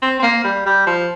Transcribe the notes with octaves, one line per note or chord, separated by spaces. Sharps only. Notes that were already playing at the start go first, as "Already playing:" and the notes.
C4
C4
A#3
G3
G3
F3